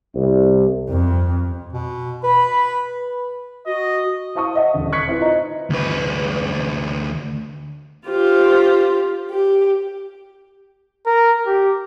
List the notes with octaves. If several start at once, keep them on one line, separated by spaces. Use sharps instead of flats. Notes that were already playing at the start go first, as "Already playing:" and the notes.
C2
F2
B2
B4 B5
F#4 D#5
E4 C5 F5 A5 C#6 D#6
D#5 E5 F#5 A5
D#1 D3
C#6 F#6 G#6 B6 C#7
C4 E4 F4 B4
D#4 D#5 A#5
D2 B4
F4 G4 C5
G4
A#4
G4